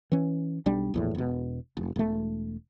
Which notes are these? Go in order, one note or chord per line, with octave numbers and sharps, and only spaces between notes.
E3 C#4
B1 G3 D4
A#1 E2 A2
E1 B2
F1
E1 A3